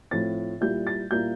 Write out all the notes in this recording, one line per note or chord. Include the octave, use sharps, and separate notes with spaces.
A2 F3 C4 A6
A#2 G3 A#3 E4 G6
A6
A#2 G3 A#3 E4 G6